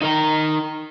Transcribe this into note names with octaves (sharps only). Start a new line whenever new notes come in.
D#4 A#4 A#5